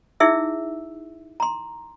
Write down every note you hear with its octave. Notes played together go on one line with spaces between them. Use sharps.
D#4 E4 G#4 E5 E6
A#5 C6